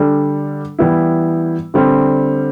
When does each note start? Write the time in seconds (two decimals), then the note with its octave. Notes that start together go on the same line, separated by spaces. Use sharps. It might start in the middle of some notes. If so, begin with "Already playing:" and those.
Already playing: D3 G3 D4 A4
0.79 E3 G3 B3 E4
1.74 D3 G3 C4